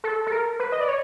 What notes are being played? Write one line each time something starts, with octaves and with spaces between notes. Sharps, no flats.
A4
A4
A#4
B4
D#5
D5
C#5